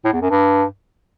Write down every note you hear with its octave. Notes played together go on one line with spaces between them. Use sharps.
A2
E2
F#2
G2